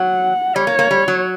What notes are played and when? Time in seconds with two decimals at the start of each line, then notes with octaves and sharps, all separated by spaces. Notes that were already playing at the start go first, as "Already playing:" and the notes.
Already playing: F#3 F#5
0.56 G3 C#5
0.67 A#3
0.79 A#3
0.91 G3
1.08 F#3